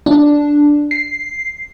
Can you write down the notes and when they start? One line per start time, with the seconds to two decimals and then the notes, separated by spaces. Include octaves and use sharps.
0.06 D4
0.91 C7